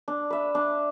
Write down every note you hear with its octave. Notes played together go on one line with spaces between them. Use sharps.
D4
B4 E5
D4